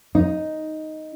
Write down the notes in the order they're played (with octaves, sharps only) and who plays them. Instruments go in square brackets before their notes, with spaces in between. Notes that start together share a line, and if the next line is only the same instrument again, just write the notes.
[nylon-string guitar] D#4